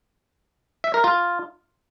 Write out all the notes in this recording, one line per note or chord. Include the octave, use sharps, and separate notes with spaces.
E5
A#4
F4